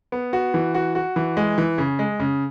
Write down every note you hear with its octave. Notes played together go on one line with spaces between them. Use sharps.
B3
F#4
E3
F#4
F#4
E3
G#3
E3
C#3
G#3
C#3